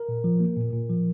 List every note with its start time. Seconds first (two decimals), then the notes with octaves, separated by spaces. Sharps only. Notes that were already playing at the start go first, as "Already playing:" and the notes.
Already playing: A#4
0.09 A#2
0.24 F3
0.40 A#3
0.57 A#2
0.73 A#2
0.89 F3